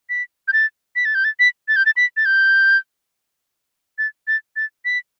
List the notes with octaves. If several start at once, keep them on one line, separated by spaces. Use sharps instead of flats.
B6
G6
A6
B6
A6
G6
A6
B6
A6
G6
A6
B6
A6
G6
A6
A6
A6
B6